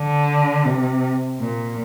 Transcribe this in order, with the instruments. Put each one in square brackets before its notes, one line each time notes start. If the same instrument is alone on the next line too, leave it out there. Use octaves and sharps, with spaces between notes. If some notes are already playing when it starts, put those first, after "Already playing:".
Already playing: [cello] D3
C3
A#2